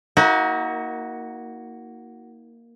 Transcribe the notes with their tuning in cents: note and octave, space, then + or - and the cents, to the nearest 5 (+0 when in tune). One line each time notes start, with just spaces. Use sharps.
A#3 +0 D#4 +45 F#4 +5